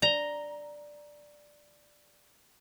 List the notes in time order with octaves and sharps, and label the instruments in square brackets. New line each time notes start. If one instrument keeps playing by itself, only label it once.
[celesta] D5 G7 [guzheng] A#5